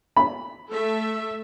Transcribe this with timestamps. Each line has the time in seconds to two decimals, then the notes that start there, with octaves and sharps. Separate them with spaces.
0.16 B5
0.70 A3 A4 E5